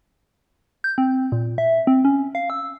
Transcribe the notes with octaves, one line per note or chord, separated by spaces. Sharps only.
G6
C4
A#2
E5
C4
C#4
F5
E6